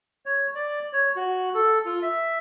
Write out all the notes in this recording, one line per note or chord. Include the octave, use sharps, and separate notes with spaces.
C#5
D5
C#5
F#4
A4
F4
E5